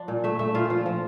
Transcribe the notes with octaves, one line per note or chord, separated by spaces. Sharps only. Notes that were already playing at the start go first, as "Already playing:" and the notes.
Already playing: F3 D4
A#2
A3 E5
A3 E5
A#2 F4
F3 F4
F3